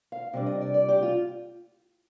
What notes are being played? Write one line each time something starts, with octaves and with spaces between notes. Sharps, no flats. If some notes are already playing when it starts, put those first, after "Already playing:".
F5
C3 G3 D4 D#5
D#5
D5
D5
G4
F4